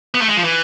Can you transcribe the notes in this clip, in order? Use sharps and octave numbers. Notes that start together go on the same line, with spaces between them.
B3
A3
G#3
F3
E3